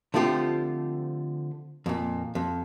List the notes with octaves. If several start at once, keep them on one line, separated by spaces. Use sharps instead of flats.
D3 F3 A3 C4 F4 G4
F2 A#2
F2